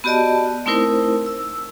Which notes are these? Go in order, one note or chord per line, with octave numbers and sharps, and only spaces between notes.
B3 F#4 G4 D5 D#5 A5
A3 C4 D#4 E4 A#4 C5
E6